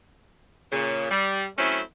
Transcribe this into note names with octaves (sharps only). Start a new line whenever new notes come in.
A#2 C#3
G3
F#3 A3 C4 C#4 E4